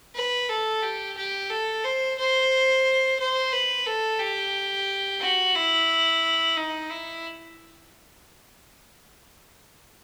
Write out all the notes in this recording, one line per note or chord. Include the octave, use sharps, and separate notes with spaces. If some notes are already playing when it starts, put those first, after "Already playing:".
B4
A4
G4
G4
A4
C5
C5
C5
B4
A4
G4
F#4
E4
D#4
E4